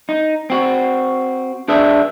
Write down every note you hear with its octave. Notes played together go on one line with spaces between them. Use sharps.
D#4
C4 F#4
D4 G#4 B4 D5 E5